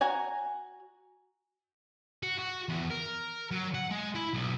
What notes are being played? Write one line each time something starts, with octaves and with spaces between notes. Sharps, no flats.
F#4 G#5 A#5
F#4
F#4
E2
A#4
F#3
F#5
G#3
E4
B1